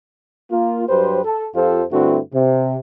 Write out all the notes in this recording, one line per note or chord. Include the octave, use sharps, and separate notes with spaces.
A#3 F4
G2 F#3 G4 B4 C5
A4
F2 F3 F4 G4 A4 C5
G2 D3 A3 C4 E4 F#4
C3